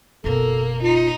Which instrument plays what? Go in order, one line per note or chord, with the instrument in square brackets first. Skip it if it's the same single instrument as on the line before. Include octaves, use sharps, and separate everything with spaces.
[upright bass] F#1 B2 [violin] A#3 [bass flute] A4
[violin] D#4 [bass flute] F4